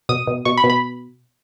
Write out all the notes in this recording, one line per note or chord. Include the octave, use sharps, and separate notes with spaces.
B2 D#6
B2
B2 C#6
B5
B2
B5